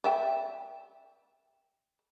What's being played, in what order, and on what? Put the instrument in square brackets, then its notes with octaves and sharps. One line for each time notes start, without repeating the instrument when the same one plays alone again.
[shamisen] D5 E5 G5